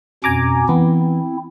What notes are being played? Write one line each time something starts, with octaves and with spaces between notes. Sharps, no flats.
F2 B2 C#4 G#5 A#5 D6
E3 B3 C4 E4